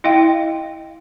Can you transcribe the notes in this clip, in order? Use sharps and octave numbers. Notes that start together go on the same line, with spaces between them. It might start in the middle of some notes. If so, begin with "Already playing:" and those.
E4 D#5 F5 G5